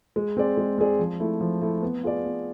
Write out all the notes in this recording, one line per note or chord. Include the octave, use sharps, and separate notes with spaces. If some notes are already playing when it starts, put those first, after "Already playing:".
G#3
C4 G#4 D5
G#3
C4 G#4 D5
F3
A3 E4
F3
A3 E4
B3
F4 G#4 D5
B3